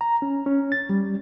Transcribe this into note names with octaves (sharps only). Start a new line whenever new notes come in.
A#5
C#4
C#4
A6
G3